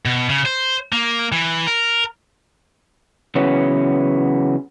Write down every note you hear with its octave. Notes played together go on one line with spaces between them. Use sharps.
B2
C#3
C5
A#3
E3
A#4
C#3 E3 F#3 B3 C#4